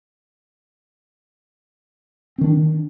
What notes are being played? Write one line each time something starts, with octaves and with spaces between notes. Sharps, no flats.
D#3 C4 D4